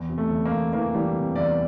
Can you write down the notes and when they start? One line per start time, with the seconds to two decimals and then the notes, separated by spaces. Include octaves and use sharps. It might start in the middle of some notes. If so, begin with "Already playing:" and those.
Already playing: E2
0.09 C3
0.18 A3
0.31 E2
0.45 A#3
0.52 E2
0.73 E3 A#3
0.94 E3 G3
1.15 C3
1.36 E2 D5